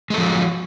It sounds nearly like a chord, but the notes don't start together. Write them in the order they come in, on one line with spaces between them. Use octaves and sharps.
G#3 A4 F3 F#3